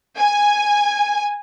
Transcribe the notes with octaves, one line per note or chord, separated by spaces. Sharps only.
G#5